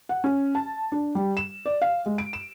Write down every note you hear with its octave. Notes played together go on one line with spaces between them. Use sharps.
F#5
C#4
A5
D4
G3
E7
D5
F5
G#3
D7
E7